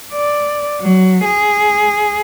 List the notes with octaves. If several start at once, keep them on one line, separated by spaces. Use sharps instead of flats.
D5
F#3
G#4